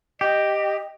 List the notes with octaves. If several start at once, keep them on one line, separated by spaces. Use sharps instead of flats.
G4 D#5